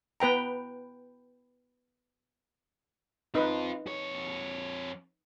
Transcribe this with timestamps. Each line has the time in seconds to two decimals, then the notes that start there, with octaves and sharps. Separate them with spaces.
0.20 B3 B4 G5 A#5
3.35 C4 D#4 F4 B4
3.86 F2 C#5